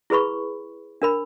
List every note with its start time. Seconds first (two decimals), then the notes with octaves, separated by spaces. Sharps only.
0.10 E4 G#4 B4 B5 C#6
1.02 D4 A#4 B5